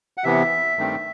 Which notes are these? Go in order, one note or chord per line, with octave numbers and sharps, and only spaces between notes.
F#5
C3 E3 B3 E5
G2 D#3 A3 C4